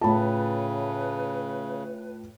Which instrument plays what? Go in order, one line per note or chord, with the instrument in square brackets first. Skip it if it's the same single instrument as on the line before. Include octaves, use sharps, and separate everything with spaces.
[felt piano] A2 A5 [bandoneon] C#3 [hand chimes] F4 G5 B5 [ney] B4